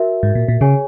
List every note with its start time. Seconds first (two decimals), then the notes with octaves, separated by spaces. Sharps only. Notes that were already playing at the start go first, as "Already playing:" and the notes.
Already playing: F#4 A#4 E5
0.23 G#2
0.35 A#2
0.48 A#2
0.61 C#3 G#4 C#5 G#5